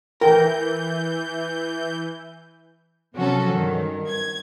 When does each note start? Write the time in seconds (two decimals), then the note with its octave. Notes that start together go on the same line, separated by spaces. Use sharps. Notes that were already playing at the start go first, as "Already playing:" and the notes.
0.21 E3 A#4 G5 G6
3.15 C3 F3 F#3 C#4 F#4 A4
3.52 G2 D#3
4.08 G#6